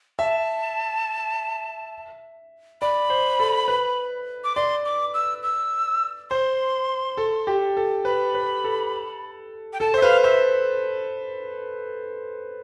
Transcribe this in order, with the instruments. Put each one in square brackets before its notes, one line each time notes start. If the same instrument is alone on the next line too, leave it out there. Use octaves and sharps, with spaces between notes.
[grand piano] E5 [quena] A5
[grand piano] D5 [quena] B5
[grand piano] C5
A4
B4
[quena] D6
[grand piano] D5 [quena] C6
[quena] D6
E6
E6
[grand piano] C5 [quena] C6
[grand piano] A4
G4
A4
[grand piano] B4 [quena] B5
[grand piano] B4
A4
[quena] G5
[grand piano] A4 [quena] A5
[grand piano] C5 [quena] E5
[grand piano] B4 [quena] F5
[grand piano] C5 [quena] E5